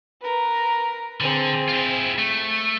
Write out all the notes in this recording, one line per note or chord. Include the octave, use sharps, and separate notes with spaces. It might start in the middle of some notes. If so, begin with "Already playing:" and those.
A#4 B4
D3 C4 G#4
E4 F4
A3